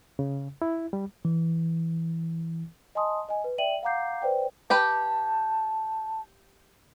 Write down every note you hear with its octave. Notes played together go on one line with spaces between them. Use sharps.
C#3
E4
G3
E3
D#5 G#5 A5 C6 D#6
D#5 G#5
B4
D5 E5 G5 D#7 F#7
F5 F#5 A#5 D6 G6 C7
B4 C5 D5 G5
G4 B4 G5 A5